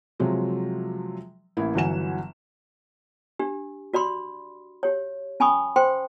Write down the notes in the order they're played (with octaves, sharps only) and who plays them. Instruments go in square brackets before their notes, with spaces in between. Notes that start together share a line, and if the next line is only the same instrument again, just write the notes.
[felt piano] C3 F3 F#3 G#3
A1 A#3 E4
G1 E3 F#3 F#5 G#5 E7
[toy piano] D4 G4
F#4 D5 B5 C6
G4 C#5
C#4 G#5 B5 C#6 D#6
C5 G5 C6